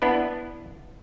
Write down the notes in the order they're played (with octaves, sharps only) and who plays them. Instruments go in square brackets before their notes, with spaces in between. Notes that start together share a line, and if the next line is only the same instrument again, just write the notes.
[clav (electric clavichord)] B3 D4 E4 B4